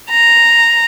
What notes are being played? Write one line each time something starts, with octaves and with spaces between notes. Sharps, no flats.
A#5